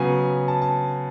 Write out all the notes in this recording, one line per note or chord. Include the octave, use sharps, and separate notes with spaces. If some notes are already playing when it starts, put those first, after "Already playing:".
Already playing: C#3 F#3 B3 G#5
A5
A5